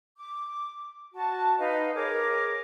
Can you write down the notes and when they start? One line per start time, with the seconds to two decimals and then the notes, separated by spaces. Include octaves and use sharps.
0.17 D6
1.13 F#4 A5
1.58 D#4 B4 D#5 F5
1.94 G#4 A#4 C#5 D6